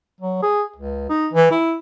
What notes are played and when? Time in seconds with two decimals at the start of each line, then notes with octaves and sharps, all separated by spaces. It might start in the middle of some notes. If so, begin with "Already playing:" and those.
0.21 F#3
0.42 G#4
0.76 C#2
1.10 D#4
1.33 E3
1.51 E4